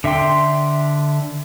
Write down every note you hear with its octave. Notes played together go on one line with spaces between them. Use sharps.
D3 E5 G5 C6